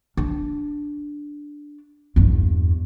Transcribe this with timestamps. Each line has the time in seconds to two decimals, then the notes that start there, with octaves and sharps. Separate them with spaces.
0.17 D4
2.16 E2 G2